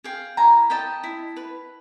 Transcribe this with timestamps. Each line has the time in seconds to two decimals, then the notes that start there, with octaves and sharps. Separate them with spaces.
0.04 G#4 F5 G5
0.37 E4 G#5 A#5
0.70 D#5 G5 A5
1.03 E4
1.37 B4